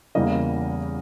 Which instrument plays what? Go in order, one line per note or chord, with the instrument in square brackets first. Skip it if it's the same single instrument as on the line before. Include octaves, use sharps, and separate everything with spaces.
[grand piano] E2 C#3 E3 G3 A#3 D#5